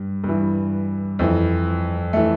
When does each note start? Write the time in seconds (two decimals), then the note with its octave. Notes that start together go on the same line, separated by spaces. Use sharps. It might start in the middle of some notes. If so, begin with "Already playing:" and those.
Already playing: G2
0.24 G2 E3
1.19 F2 E3
2.13 E3 A3